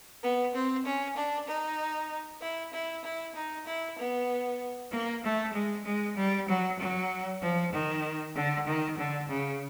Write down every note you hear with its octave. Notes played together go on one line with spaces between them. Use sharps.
B3
C4
C#4
D4
D#4
E4
E4
E4
D#4
E4
B3
A#3
A3
G#3
G#3
G3
F#3
F#3
F3
D#3
D3
D#3
D3
C#3